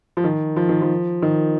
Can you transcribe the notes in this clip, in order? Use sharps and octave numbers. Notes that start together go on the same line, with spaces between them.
F3
D#3
F3
D#3
F3
D#3